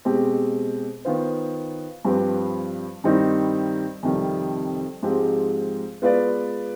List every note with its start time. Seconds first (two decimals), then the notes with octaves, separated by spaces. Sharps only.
0.05 B2 G#3 C4 G4
1.05 D#3 B3 F4 C5
2.05 G2 F3 C4 G4 B4
3.04 G2 D#3 G3 C4 D#4
4.03 F2 C3 D#3 G3
5.03 G#2 F3 G#3 C4 G4
6.02 G#3 B3 F4 B4 D5